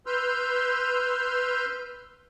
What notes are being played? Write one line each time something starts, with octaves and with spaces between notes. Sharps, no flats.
B4 C6 E6 F6 G6